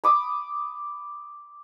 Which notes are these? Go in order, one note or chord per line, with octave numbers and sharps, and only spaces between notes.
B5 D6 D#6